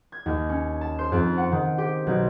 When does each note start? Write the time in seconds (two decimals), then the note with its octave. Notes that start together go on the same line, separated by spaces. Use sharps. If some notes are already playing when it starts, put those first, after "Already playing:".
0.12 G#6
0.26 D#2
0.49 C#4
0.81 A5
0.99 C5
1.12 F2
1.38 F#5
1.52 D#3
1.78 G4
2.07 B1